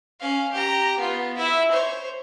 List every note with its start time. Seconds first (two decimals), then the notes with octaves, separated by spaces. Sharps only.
0.19 C#4 F5
0.52 G4 A#5
0.98 B3 F4
1.37 E4 E5
1.71 C5 C#5